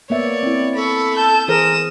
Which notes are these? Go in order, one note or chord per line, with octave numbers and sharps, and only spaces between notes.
A#3 B3 C#5 D5 E5
C4 E4
A4 B5 C#6
A5 G6
E3 G#4 A#4 C5 D#6 E7